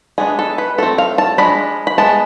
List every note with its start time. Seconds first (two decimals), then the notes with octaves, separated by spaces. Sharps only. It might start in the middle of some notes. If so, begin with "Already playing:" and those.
0.18 G#3 B3 D4 G#4
0.39 A4
0.58 B4
0.78 F3 A3 C4 A4
0.98 F5
1.18 A5
1.38 F3 G#3 D4 B5
1.87 B5
1.98 G#3 B3 A5